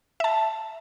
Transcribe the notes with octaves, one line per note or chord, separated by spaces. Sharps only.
E5 A5